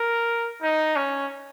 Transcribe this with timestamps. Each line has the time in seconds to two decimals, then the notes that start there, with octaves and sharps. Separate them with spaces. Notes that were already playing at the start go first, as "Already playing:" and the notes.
Already playing: A#4
0.62 D#4
0.96 C#4